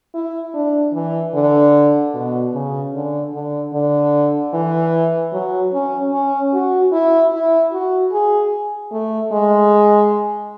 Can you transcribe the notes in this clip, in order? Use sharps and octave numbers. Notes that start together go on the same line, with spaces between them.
E4
D4
E3
D3
B2
C#3
D3
D3
D3
E3
F#3
C#4
C#4
F#4
E4
E4
F#4
G#4
A3
G#3